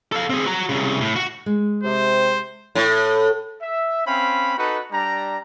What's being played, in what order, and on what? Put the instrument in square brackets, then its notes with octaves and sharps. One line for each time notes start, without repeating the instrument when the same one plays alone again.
[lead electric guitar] A4 F5
C4 G#4
F#4 A#5
C2 C#3
A2
F#4
[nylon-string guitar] G#3
[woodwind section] C3 [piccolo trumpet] C5
[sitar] A2
[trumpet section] E5
C4 C#4 F5 B5
D#4 F#4 A4 B4
G3 D4 A#5